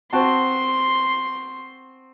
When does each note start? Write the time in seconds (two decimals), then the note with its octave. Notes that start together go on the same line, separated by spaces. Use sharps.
0.13 C4 F#4 A5 C6